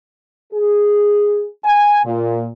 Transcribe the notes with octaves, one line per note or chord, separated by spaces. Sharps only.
G#4
G#5
A#2